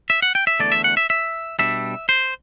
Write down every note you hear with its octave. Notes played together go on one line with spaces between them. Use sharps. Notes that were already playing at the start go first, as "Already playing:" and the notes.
E5
F#5
G5
E5
E2 D3 A3 D5
E5
F#5
E5
E5
B2 G3 D4 E5
C5